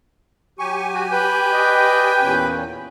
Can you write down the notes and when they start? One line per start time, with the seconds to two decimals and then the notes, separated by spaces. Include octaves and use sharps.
0.59 F#3 G4 G#5 C#6
0.94 F#4
1.12 B4 G5
1.52 D5 D#5
2.20 E2 A#2 C#4